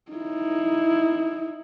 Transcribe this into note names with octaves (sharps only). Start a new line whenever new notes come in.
D#4 E4